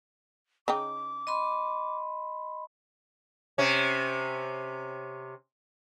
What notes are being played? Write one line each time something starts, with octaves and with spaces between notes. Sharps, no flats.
C#3 D#4 G5 D6
D#5 B5 C6
C3 C#4